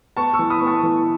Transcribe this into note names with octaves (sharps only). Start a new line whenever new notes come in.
B3 A5 C#6
C#6 E6
E3
B5 D#6
B3
A5 C#6
E3